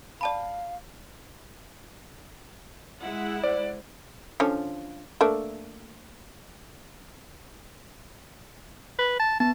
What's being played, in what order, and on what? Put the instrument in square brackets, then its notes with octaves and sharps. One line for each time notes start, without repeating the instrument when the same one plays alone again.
[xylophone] D5 A5 B5 [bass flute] F5
[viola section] G#3 E4 F#5
[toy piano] C5 [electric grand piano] D5
[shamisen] D3 F3 C#4
A3 A#3 D4
[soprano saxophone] B4
A5
[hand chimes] B3 [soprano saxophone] A5